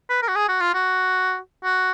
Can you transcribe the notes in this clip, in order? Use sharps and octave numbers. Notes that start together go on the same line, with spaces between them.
B4
A#4
F#4
G#4
F#4
F4
F#4
F#4